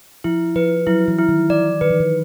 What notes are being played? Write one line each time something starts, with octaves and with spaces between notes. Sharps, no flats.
F3 E4
F3 B4
F#3 E4
E3
E4
D#3
E3 D5
D#3 B4
E3
D#3